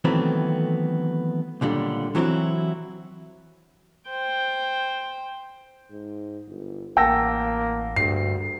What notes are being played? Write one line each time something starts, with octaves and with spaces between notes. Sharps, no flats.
D#3 E3 F#3 A3 B3 C4
C#2 A#2 D3 G3
E3 F#3 C4 E4 F#4
C5 G5
G#2
G1
A1 A#3 F#5 G5 A5 E6 A#6
D2 G2 C7